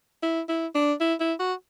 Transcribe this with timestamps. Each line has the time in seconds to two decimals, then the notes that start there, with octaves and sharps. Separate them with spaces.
0.23 E4
0.49 E4
0.75 D4
1.00 E4
1.20 E4
1.39 F#4